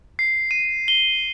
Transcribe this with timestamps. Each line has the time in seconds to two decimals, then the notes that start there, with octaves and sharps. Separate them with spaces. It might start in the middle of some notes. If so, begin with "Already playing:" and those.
0.19 C7
0.51 D#7
0.88 G7